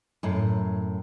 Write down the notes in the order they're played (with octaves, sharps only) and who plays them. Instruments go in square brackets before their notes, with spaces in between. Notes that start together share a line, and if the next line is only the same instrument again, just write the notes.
[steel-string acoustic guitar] F#2 A2